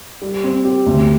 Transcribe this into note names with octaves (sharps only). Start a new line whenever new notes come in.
G3
C4
G4
D2